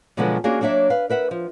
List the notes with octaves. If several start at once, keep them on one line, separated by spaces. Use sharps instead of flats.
B2 D3 F3 F#3 G#3 B3
A#3 C#4 D4 F4 F#4 G#4
F#3 A#3 D4 C#5 E5
B4 F5
A#4 B4 E5 F#5
F3